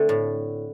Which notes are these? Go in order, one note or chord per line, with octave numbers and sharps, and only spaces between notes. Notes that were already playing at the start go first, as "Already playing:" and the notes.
Already playing: D3 A3 C4
A2